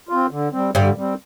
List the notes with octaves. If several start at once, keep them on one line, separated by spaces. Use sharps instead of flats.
C4 F4
D3
G3 C4
G2 D3 G3
G3 C4